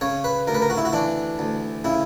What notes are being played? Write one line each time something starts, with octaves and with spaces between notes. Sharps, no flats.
C#3 C#5
B4
D2 A#4
B4
A#4
F#4
E4
F#4
E3 D4
D2
C#3 E4